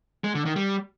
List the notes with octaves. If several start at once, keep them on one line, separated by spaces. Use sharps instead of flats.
G#3
D3
D#3
G3